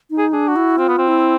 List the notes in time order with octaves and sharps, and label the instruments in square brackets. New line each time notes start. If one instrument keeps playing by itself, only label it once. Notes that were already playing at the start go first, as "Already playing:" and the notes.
[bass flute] D#4
[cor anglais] G#4
[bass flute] D4 [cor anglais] G#4
[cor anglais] F#4
[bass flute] E4
[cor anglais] C4 [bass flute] F4
[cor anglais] B3
C4
[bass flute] E4